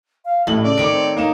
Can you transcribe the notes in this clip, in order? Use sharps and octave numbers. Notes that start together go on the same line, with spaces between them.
F5
A1 A2 A3 E4 F#7
C#3 D5
D#3 A4 C#5 D6 D7
C4
A#3 D#4 A#5 E7